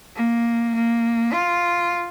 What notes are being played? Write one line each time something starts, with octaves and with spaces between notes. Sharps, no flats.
A#3
A#3
F4